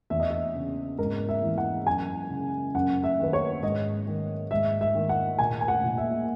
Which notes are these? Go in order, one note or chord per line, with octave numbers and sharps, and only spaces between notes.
E2 E5
D#5
E5
C#3
G#2 A#4
E5
E3
F#5
F#2 G#5
C#3
F#2 F#5
E5
D#3 B4
C#5
G#2 D#5
D#3
G#2 E5
E5
D#3
F#5
A#2 G#5
G#5
F#5
A#2
E5